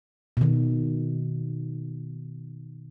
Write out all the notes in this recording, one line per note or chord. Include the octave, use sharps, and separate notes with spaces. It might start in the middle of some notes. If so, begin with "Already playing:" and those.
B2 D#3